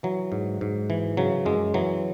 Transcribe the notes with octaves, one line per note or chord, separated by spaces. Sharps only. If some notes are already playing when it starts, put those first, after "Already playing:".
E3 F#3
G#2
G#2
E3
C#3 F#3
F#2 G#3
E3 F#3